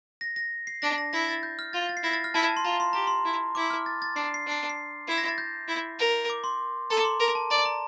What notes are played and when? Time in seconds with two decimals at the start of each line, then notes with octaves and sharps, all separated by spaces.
0.21 A#6
0.36 A#6
0.67 C7
0.82 D4 A#6
0.98 A#6
1.13 E4 A#6
1.28 A6
1.43 G6
1.59 F6
1.73 F4 A6
1.89 A6
1.97 C7
2.03 E4 A#6
2.13 A6
2.24 F6
2.34 E4 A5
2.49 A5
2.57 C6
2.65 F4 A#5
2.80 C6
2.93 G4 A#5
3.07 C6
3.25 E4
3.55 E4 D6
3.70 F6
3.86 A6
4.02 A6
4.16 D4 C7
4.34 C7
4.46 D4
4.51 C7
4.70 C7
5.08 E4 C7
5.18 A#6
5.28 A6
5.38 G6
5.68 E4
5.99 A#4
6.30 D6
6.44 C6
6.90 A4 A#5
7.00 D6
7.05 C6
7.20 A#4
7.35 A5
7.50 D5 A#5
7.65 A#5